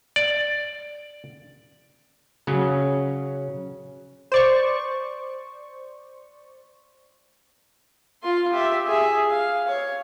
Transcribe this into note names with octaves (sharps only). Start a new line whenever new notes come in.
D5
C#3 F#3 C#4
C5 D5 C#6
F4 C6
G4 E5
G#4 E5
F5
C#5